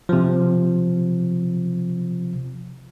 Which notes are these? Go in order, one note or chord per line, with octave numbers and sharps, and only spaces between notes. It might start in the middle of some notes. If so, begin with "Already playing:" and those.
C3 F3